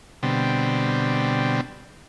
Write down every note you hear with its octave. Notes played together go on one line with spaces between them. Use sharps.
B2 D3 G3 C4